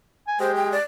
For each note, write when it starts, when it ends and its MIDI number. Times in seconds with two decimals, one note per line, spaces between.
0.28 0.39 80
0.40 0.75 56
0.40 0.75 67
0.40 0.54 72
0.56 0.70 79
0.72 0.83 74